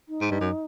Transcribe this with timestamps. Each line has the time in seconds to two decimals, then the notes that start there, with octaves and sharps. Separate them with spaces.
0.09 D#4
0.21 G#2
0.31 G2
0.41 F#2